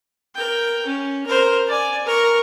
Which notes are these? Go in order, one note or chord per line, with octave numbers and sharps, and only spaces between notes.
A#4 G5
C#4
A#4 C5
D5 G#5
A#4 C#6